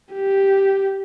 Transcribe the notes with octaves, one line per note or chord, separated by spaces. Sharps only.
G4